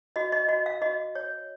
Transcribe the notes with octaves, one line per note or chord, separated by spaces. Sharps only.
F#4 D#5
D#5
F#4 D#5
F5
F#4 D#5
C#5